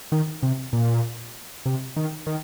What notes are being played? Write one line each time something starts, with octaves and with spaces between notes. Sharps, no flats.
D#3
C3
A#2
C3
D#3
D#3